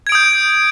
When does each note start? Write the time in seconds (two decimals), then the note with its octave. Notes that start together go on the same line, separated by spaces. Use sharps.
0.07 G#6
0.09 D7
0.12 D#6
0.15 G6